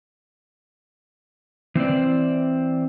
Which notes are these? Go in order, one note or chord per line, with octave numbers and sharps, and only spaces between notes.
E3 C4 C5 D5